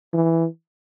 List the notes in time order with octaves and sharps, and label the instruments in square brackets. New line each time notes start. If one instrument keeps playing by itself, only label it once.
[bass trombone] E3